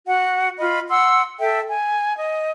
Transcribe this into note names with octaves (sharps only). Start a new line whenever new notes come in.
F#4 F#5
F4 D#5 B5
F#5 C6 E6
A4 E5 G5
G#5
D#5